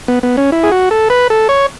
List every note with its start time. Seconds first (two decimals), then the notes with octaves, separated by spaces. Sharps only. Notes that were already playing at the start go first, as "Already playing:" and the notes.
0.08 B3
0.23 B3
0.37 C#4
0.52 E4
0.63 G#4
0.72 F#4
0.91 A4
1.10 B4
1.30 A4
1.49 C#5